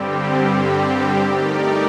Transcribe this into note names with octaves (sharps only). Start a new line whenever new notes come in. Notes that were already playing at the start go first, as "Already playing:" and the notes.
Already playing: G2 D3 G3 C4 G4
A3 D#4 G4 A#4 D5